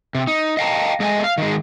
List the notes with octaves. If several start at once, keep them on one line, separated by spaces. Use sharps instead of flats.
C3
D#4
D#5 F5 G5 A5 A#5
G#3 A3 D#5 G5 G#5
F5
D#3 G#3